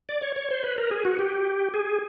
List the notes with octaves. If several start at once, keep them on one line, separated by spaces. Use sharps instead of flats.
D5
C#5
C#5
C5
B4
A#4
G#4
F#4
G4
G#4